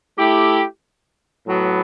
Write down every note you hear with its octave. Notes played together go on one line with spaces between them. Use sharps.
A3 E4 G4
A2 F#3 B3